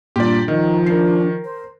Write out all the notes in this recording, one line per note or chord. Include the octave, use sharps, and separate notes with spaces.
G2 A#2 G4 D5
D#3 F3 D#4 D#5
D4 A#4 C7
C5